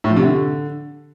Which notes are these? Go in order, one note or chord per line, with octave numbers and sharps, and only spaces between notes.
A2
F3
C3
D3